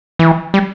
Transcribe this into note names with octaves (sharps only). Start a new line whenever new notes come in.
E3
G3